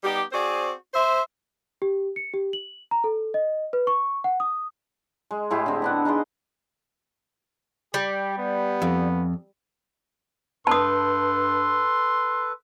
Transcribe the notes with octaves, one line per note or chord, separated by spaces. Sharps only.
G3 B3 D#4 G4
C4 F#4 G#4 C5 D5
C5 E5
G4
C#7
G4
F#7
A#5
A4
D#5
B4
C#6
F#5
D#6
G#3
A2 G#3 E4 G4
D3 C4
B3 D4 F#5
D#4 G#4 D5 C6
G3 G4
B3
F2
G2 A4 B4 A5 C6 D#6